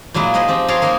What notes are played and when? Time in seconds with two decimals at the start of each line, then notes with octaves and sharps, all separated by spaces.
0.14 A#2 F#3 G#3 A#3 E4
0.34 D#4 G#4 C5 D#5 B5
0.48 F3 C4 G4
0.68 F4 G#4 C5 C#5 G5 A#5
0.82 A#3 D#4 C#5 D#5 G#5